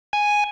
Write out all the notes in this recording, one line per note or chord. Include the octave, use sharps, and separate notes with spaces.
G#5